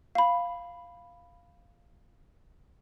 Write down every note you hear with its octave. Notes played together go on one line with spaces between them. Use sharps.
F5 B5